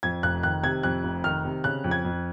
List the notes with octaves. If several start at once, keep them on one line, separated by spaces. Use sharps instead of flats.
F2 G#6
F1 F#6
D#3 F#6
C3 G#6
F2 F#6
F1
D#3 F6
C3
C#3 F#6
F2
G#6
F2